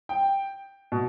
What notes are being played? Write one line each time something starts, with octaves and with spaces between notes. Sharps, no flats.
G5
B2